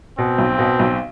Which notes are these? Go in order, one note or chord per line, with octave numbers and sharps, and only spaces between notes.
B2 C4
B1
B2
B1